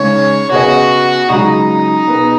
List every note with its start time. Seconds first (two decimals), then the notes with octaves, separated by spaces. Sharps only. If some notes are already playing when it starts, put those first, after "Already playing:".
Already playing: C#3 G#3 D#4 G#4 C#5
0.51 C#3 B3 F#4 G#4 B4 D#5
1.29 C#2 C#3 F#3 D#4
2.07 B2 B3 G#4 B4